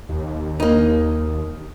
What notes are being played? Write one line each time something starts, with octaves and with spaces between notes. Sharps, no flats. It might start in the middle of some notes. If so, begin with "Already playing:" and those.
D#2
A#3 D#4